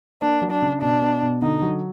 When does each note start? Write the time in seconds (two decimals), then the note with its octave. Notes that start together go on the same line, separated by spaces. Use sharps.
0.22 A#3 D4
0.42 F#3
0.51 D4
0.62 C#3
0.81 B2 D4
1.02 B3
1.22 B2
1.42 D3 D#4
1.62 F#3